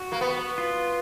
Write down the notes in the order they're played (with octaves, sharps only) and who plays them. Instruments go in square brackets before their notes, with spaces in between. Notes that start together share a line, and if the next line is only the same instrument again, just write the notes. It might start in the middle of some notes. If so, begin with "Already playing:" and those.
Already playing: [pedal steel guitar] F#4
[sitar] A#3
B3
[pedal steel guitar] F4